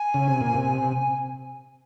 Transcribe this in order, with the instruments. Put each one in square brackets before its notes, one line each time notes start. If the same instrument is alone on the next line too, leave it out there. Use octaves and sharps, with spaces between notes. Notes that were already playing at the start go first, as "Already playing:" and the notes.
Already playing: [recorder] G#5
[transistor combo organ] C#3
C3
A#2
C3